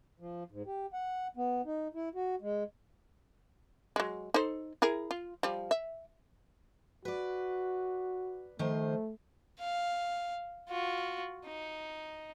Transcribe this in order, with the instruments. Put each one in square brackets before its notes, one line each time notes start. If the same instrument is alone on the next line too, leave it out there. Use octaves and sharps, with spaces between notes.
[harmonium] F3
G#2
G4
F#5
B3
D#4
E4
F#4
G#3
[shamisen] F#3 G#3
D#4 A4 C5
E4 G#4 A#4
F4
F3 G3
E5
[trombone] F#4 [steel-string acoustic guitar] B4 D5
[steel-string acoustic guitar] D#3 F3 C5 [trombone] A3
[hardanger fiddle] F5
F4 F#4
D#4